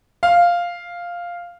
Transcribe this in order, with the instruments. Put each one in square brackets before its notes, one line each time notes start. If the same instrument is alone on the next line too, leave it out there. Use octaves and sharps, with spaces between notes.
[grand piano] F5